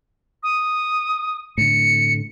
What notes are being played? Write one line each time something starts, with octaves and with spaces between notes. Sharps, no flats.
D#6
A2 D3 C#7